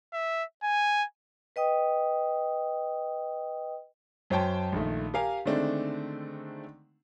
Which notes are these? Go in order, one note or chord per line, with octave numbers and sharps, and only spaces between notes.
E5
G#5
B4 D#5 G5 D#6
F#2 C5 C#5 G5 A5
A#1 D#3 A3
G4 A#4 F5 G#5
D3 D#3 G#3 A3 C4 D4